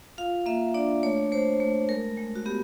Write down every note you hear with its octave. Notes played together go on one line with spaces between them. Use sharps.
F4 F5
A#3 E5
D4 D5
A3 C#5
A3 C5
A3
G#3 A#4
G#3
F#4
B3 G4